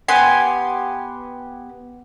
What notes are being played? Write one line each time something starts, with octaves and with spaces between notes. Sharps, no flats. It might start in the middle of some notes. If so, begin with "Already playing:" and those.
B3 G4 G#5 C6